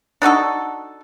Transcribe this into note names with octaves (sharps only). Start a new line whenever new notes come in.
D4 D#4 F#4 A4